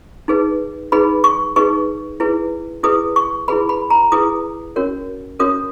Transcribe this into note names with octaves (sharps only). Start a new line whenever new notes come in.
D#4 G#4 B4
D#4 G#4 B4 B5
C#6
D#4 G#4 B4 C#6
E4 G#4 B4
E4 G#4 B4 D#6
C#6
E4 G#4 B4 B5
B5
A#5
E4 G#4 B4 D#6
C#4 F#4 A#4 C#5
C#4 F#4 A#4 C#5 D#6